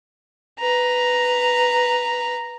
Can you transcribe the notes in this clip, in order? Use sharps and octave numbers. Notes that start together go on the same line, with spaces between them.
B4 A#5